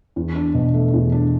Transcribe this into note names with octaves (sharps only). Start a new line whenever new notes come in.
E2
D4
B2
A3
E2
D4